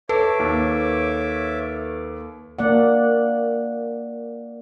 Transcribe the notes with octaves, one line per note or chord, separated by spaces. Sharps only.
A4 B4 C#5 E5 A5 D6
D#2
A#3 D5 F#5